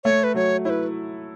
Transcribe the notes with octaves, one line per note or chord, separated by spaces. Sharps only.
A3 C#5
B4
F#3 C#5
E4 B4 C#5